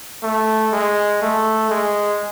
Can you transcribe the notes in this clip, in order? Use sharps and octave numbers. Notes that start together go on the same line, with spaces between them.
A3
G#3
A3
G#3